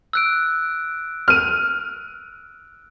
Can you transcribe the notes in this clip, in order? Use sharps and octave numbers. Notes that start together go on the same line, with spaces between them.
E6 F#6 D7
F6 D#7